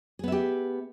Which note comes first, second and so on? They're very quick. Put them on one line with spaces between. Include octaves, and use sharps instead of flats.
G#4 B3 E5 G4